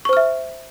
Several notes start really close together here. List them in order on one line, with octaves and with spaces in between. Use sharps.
C#6 C5 F6 E5